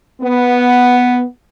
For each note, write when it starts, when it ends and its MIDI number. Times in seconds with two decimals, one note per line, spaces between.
0.21 1.23 59